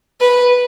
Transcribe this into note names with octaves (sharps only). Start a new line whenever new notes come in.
B4